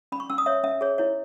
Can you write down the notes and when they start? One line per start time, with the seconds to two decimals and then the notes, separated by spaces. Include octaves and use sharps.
0.12 C#4 B5
0.20 C#6
0.30 C#4 E6
0.38 D#6
0.46 C#5 E5
0.63 C#4 E5
0.81 G#4 C#5
0.98 E4 C#5